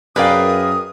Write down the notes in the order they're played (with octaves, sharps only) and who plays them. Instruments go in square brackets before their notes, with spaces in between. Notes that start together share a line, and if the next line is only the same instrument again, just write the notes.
[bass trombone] F#2 [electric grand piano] G#4 A#4 G5 [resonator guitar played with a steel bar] B4 D5 F5 [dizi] D#6